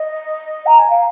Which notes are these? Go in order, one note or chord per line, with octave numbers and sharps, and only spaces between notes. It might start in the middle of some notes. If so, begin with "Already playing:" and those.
Already playing: D#5
A#5
G#5
F5